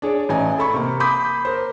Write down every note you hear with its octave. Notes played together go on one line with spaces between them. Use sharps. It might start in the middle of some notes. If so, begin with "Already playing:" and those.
D4 G#4 C#5 D5
A1 D#4 G#5
A4 B5 C#6
C3 A#3
B5 C6 D6 D#6 G6 B6
A#4 C5